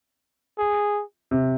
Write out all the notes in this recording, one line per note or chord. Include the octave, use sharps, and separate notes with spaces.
G#4
C3